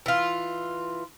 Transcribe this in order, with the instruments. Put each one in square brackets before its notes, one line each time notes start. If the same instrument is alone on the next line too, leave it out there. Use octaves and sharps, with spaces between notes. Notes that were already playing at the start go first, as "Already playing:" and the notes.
[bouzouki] E3 F4